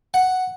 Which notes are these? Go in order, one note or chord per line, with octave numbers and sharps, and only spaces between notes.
F#5